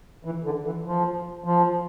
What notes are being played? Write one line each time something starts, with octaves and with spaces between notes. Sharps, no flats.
E3
D3
E3
F3
F3